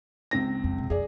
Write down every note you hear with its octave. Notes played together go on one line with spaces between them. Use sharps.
C#2 C4 A#6
F2
B2
F2 G#4 D5